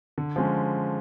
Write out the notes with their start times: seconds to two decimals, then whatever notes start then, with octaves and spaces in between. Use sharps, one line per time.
0.18 D3
0.36 F3 G#3 C#4